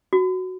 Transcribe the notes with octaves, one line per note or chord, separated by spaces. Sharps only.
F#4